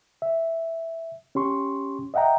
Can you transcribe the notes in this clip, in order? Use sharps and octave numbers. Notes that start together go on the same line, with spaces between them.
E5
C#4 G4 C6 C#6
D#5 E5 F#5 G5 A#5